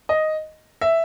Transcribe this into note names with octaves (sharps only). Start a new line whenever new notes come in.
D#5
E5